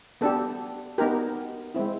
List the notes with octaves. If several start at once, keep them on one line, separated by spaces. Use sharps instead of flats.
B3 D4 G4 A4
B3 D#4 G4 A#4
G#3 C4 E4